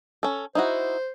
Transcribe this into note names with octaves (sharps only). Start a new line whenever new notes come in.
C#4 A4
D#4 E4 F#4 C5